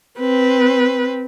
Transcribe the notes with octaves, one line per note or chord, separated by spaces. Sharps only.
C4 B4